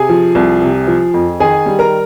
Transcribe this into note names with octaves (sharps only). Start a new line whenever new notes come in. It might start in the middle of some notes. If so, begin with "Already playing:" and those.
Already playing: C3 G#4 G#5
F3
C2
C3
F3
F2
D#3 G#4 G#5
G3
A#4 A#5